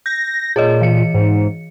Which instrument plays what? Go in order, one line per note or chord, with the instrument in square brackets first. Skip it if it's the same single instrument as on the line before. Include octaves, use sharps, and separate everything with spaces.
[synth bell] G6 [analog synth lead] A#6
[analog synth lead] A#2 [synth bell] G#4 C#5 D#5
[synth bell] E3 C#7
[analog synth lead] G#2